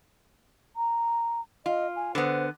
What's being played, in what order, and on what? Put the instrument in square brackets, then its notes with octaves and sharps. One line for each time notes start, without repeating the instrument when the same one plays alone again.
[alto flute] A#5
[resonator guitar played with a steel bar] F4 [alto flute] D#5
[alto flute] G#5
[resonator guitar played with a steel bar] D3 B3 [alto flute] C5